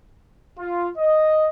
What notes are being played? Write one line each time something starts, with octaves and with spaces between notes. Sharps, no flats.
F4
D#5